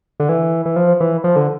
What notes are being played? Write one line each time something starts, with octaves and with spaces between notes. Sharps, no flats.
D3
E3
E3
F3
E3
F3
D3